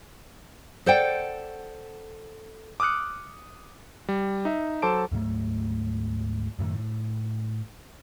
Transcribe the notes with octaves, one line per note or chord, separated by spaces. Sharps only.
A4 C5 D5 F#5 G5
D6 D#6 F6 F#6 C#7
G3
D#4 E5
F#3 A4 C5 A5 D6 D7
D2 G#2 F#3 A3
F#2 A2 D3 D#3
A2